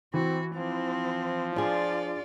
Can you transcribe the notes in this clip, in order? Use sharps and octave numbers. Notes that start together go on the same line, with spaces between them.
E3 C4 F#4
F3 C4
D4 F4 G#4 D5